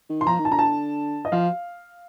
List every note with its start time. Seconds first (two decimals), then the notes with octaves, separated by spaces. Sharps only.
0.10 D#3
0.21 C6
0.27 F3 A#5
0.39 D#3
0.45 A5
0.51 D3 A#5
0.59 A5
1.25 D#5
1.32 F3 F5